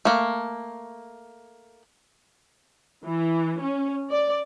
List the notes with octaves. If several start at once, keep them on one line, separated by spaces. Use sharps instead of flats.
A3 A#3
E3
C#4
D5